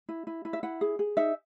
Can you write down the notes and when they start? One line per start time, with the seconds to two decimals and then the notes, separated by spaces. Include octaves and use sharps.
0.09 E4
0.27 E4
0.45 E4
0.53 E5
0.63 E4 F#5
0.81 G#4
0.99 G#4
1.17 D#4 E5